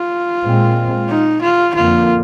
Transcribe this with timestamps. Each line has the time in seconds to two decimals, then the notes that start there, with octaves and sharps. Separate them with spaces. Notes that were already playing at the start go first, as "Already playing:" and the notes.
Already playing: F4
0.43 A#2 G#3 C4
1.09 D#4
1.42 F4
1.75 F2 D3 F3 A#3 F4